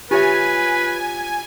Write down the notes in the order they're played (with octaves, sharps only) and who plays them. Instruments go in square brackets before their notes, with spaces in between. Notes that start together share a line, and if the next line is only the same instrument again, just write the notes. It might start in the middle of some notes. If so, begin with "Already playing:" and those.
[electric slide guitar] F4 C#5 [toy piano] G4 E5 [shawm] B4 [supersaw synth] G#5